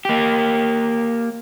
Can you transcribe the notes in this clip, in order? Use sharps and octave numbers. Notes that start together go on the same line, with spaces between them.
A#3 G4